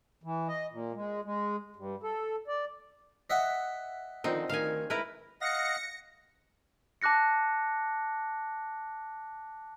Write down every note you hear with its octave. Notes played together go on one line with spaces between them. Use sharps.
E3
D#5
A#2
G#3
G#3
G2
A4
D5
D#5 E5 F#5
D3 D#3 F3 C4 D#4
D2 D#3 F5 G#5
G#3 E4 A#4 B4
D#5 F5 F#5 A#6 C#7
A5 D6 F#6 A#6 C#7